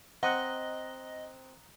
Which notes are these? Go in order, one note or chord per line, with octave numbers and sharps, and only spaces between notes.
C4 D#5 F#5 A#5 D#6 F#6